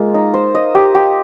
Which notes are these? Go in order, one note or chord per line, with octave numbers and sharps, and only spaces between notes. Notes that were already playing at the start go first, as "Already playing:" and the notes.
Already playing: G#3 A#3 F4
D#4
C5
D#5
G4
G4